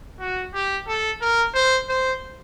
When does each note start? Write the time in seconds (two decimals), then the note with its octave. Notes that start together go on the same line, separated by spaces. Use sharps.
0.20 F#4
0.54 G4
0.87 A4
1.21 A#4
1.54 C5
1.88 C5